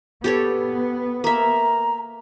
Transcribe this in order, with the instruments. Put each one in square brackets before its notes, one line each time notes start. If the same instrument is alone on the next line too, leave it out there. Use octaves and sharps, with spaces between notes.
[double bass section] B3 [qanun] G4 A4 C#5
[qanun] A#3 E5 [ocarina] A#5